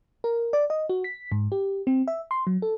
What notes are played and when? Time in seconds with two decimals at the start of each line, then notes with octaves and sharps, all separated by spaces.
0.24 A#4
0.53 D5
0.70 D#5
0.89 F#4
1.04 B6
1.32 G#2
1.52 G4
1.87 C4
2.08 E5
2.31 C6
2.47 F#3
2.62 A4